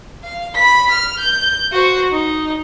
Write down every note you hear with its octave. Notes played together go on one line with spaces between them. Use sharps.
F5
B5 B6
F6
G6
F#4 C5
D#4